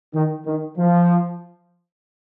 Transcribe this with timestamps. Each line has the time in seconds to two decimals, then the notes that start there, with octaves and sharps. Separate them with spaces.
0.14 D#3
0.46 D#3
0.78 F3